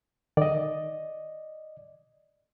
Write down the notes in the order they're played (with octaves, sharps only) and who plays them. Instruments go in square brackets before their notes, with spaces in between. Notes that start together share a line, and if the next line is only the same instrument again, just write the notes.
[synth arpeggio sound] D#3 [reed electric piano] D5 D#5